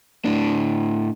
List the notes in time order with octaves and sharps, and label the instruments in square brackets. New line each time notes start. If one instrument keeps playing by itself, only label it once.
[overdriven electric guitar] A2 D4